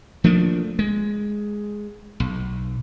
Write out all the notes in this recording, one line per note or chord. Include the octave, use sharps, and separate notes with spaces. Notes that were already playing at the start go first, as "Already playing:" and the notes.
F3 A3 A#3 D4
G#3
B1